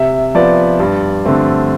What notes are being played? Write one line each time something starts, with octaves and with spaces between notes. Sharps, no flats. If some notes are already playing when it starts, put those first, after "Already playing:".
Already playing: C3 E5
F3 B3 D5
G2
D3 A3 C4